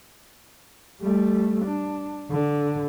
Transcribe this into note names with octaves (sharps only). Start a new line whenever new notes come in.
G3 A3
D4
D3